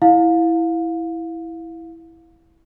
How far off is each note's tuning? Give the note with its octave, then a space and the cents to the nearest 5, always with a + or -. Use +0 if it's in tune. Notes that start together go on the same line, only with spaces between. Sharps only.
E4 +0 F5 +25